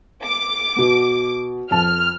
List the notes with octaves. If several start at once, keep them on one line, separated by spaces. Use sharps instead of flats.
D6
B2 B3
F2 A5 F6